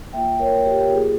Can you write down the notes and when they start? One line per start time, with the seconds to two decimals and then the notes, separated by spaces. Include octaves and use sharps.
0.13 A#3 F4 E5 G5
0.39 A#4 C#5
0.66 G4
0.81 G4
0.91 A#3 F4 G#4